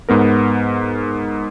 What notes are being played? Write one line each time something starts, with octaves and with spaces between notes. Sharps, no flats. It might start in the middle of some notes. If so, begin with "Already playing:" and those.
G#2 B3 A#4